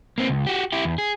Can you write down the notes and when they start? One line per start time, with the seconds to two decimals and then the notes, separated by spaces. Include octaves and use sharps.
0.18 A#3 C4
0.29 C#2
0.47 F#4 G4
0.72 E4 G4
0.85 E2
0.98 G#4